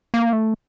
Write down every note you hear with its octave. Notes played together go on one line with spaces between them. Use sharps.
A#3
A3